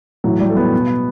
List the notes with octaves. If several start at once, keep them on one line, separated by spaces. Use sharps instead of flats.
A2 E3 F#3
G3
A3
B3
B2